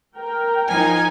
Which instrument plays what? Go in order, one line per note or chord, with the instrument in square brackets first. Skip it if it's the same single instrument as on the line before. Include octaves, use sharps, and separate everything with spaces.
[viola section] A#4 G5
[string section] F3 D#4 [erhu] G#5